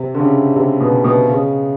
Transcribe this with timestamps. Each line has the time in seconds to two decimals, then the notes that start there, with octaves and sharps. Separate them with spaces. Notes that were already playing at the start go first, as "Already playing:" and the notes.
Already playing: C3
0.14 D3
0.20 C#3
0.56 C3
0.80 B2
1.04 B2
1.29 C#3